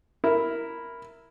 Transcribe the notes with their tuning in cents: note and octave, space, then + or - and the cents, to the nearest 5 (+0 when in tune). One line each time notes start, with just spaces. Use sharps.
E4 +0 A#4 +0